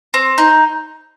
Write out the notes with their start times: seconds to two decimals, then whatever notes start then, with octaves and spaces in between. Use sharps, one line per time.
0.14 C4
0.38 D#4